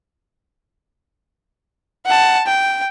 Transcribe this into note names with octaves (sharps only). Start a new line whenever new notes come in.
F#5 A5
G5